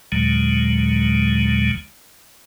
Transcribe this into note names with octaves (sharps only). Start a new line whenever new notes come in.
D#2 A#2 D3 F#3 G#3